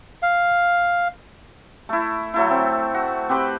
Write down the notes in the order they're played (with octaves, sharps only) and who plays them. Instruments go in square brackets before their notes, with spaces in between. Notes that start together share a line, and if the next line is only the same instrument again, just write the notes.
[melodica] F5
[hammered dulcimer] A3 E4
F#3 A3 E4
C4
F#4
C4 G4 B4 B5